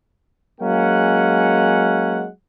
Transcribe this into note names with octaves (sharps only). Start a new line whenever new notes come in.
F#3 G#3 A#3 C#4 F#5